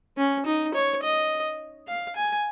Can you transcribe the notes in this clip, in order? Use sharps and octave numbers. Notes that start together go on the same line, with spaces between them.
C#4
D#4
C#5
D#5
F5
G#5